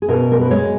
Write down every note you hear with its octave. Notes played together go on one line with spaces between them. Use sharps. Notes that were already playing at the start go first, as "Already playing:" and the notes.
G#4
B2 A#4
A#4
B4
G#3 C#5